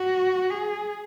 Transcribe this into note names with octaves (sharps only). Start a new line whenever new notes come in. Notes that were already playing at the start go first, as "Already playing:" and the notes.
Already playing: F#4
G#4